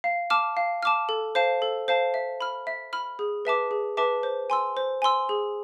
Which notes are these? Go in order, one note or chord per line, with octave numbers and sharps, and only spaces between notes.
F5
A5 D6 F6
F5
A5 D6 F6
A4
C5 F5 A5
A4
C5 F5 A5
E5
B5 F6
E5
B5 F6
G#4
B4 E5 A5 D6
G#4
B4 E5 A5 D6
C5
G#5 C6 E6
C5
G#5 C6 E6
G#4